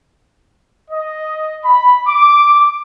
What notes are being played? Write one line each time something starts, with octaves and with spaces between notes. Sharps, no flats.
D#5
B5
D6